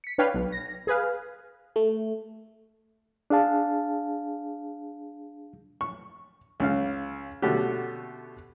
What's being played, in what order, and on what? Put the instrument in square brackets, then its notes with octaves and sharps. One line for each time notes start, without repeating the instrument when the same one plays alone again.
[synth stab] B6 C#7
D4 B4 C#5 F5 G5
B1
A#6
G#4 B4 F5
[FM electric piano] A3
[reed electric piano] D4 G#4 F5 A5
[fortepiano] C#6
C#2 C#3 F5
B2 D3 A3 C#4 F#4 G4